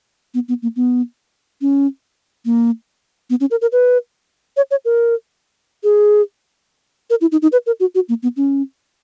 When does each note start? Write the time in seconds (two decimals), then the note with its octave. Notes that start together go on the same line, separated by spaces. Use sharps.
0.34 B3
0.49 B3
0.63 A#3
0.76 B3
1.61 C#4
2.45 A#3
3.30 B3
3.41 C#4
3.51 A#4
3.62 A#4
3.72 B4
4.57 C#5
4.71 C#5
4.85 A#4
5.84 G#4
7.10 A#4
7.21 E4
7.32 D#4
7.42 D#4
7.52 B4
7.67 A#4
7.80 F#4
7.95 F#4
8.09 A#3
8.23 B3
8.37 C#4